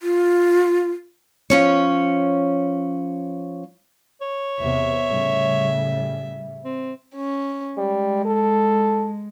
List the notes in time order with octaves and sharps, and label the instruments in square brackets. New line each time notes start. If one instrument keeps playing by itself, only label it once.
[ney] F4
[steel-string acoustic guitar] F3 C#4 C#5
[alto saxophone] C#5
[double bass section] E2 C3 B3 [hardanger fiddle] E5
[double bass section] A2 C#3 G3
[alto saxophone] C4
[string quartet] C#4
[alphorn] G3 [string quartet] G#3
[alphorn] A4